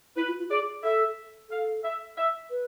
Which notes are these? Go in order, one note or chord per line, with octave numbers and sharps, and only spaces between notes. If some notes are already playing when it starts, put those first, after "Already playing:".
E4 B4
F4
F4
G#4 D5
A4 E5
A4 F5
E5
E5
B4